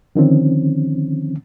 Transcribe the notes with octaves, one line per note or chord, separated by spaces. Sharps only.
D3 D#3 F3 C4 C#4